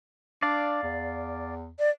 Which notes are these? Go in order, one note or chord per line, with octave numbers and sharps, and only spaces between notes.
D4 D5 F5
E2
D5